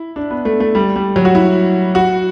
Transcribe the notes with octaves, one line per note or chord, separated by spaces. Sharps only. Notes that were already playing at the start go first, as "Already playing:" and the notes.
Already playing: E4
D4
B3
A3
A3
G3
G3
F#3
F#4
E4
F#4